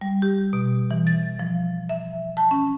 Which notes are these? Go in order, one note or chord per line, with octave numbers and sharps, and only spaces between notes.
G3
G4
B2
E3
A6
F3
E5
A5
C#4